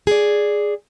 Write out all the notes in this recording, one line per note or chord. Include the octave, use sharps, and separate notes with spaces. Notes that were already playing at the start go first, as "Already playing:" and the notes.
G#4 D5